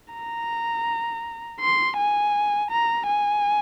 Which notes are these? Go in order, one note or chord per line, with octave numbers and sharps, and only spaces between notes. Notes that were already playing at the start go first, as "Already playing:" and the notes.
A#5
C6
G#5
A#5
G#5